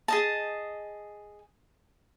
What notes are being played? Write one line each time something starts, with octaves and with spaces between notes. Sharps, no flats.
G#4 D#5 A5